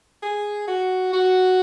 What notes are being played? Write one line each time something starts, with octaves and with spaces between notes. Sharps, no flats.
G#4
F#4
F#4